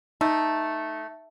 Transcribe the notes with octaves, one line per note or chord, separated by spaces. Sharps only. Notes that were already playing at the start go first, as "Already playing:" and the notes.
A3 D#4